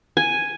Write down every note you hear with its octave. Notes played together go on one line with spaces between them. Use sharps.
G#5